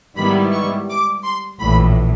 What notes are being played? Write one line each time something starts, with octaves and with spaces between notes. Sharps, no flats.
G#2 D#3 G3 B3 E4 B5
C#6
D6
C6
A#1 A2 E3 B5